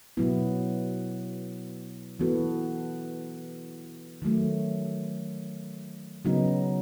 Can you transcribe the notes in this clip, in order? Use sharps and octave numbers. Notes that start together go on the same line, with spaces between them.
B2 F#3 B3 E4
E3 B3 F#4 A4
D#3 F#3 A3
C#3 F#3 B3 D#4